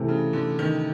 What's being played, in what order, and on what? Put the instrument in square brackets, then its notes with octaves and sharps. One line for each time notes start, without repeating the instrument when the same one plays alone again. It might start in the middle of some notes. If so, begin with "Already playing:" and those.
Already playing: [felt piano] C3 E3 A3
[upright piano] C#3
D3
D#3